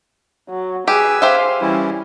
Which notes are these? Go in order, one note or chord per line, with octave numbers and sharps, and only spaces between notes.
F#3
G4 G#4 B4 G#5 E6
G4 C5 E5 F5
E3 G3 C#4 E4